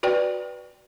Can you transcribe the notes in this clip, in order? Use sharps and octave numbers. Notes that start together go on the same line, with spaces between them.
F#4 B4 D5 G5